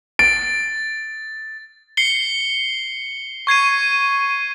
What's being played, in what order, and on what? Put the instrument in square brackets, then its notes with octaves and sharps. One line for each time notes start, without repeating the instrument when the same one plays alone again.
[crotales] A6 [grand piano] D7
[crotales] C7 C#7 G7
C#6 G#6 C7 D#7